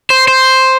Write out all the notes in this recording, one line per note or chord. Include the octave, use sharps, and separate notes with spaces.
C5
C5